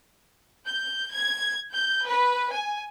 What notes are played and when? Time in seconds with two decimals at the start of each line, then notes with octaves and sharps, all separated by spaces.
0.65 G6
1.11 G#6
1.73 G6
2.05 B4
2.52 G#5